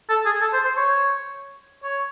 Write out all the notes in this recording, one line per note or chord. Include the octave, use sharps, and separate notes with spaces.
A4
G#4
A4
C5
C5
C#5
C#5